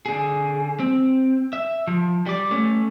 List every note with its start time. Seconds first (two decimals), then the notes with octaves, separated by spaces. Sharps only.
0.06 D3 G#4
0.80 C4
1.53 E5
1.87 F3
2.26 G3 D5
2.51 A3 C#4